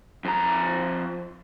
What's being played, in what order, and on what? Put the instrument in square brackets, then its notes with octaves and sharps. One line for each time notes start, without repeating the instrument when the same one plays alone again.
[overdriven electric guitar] F2 A#5